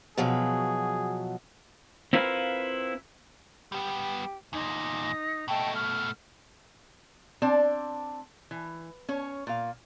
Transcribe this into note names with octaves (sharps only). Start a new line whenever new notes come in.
B2 F3 F#3 G#4
C4 E4 F4 A#4 B4 F5
G3 B3 G4
E2 A#2 D#4
B2 A3 D#5 G5 A5
F6
C4 D4 D5 A5
E3
C#4 C#5
A#2 F5